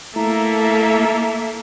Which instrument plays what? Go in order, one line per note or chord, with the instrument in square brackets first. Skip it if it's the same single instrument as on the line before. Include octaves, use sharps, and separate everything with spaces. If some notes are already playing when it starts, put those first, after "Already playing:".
[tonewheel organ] A3 E4 [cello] A#3 [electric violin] A4 E5 [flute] A#5